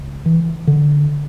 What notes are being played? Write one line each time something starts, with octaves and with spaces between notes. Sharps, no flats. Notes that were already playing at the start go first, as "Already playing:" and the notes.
Already playing: C#2
E3
D3